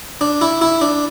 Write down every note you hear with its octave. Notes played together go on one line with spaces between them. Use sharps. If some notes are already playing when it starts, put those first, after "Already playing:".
D4
E4
E4
D4